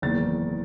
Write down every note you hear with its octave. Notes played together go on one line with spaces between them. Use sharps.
F#1 E2 D#3 A6